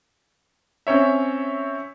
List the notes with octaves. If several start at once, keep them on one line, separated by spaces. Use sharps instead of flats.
C4 C#4 C#5 E5